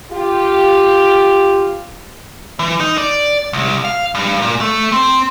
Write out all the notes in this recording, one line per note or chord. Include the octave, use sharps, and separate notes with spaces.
F4 G4
E3
D#4
D5
C2
F5
G2
A#2
A3
C4